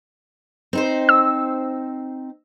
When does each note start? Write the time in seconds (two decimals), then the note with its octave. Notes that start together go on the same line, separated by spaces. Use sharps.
0.73 C4 D#4 C5
1.09 E6